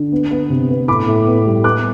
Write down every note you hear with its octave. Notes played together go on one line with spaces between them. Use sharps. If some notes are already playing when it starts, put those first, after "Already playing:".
Already playing: D3
B3
B3
C3
B3
A2 B5 D6
A2
B3
G3
B3 D6 F#6